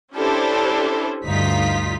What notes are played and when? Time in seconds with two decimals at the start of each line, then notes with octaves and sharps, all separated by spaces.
0.13 C#4 D4 E4 G4 A4 C5
1.26 D2 G2 D#4 F4 B6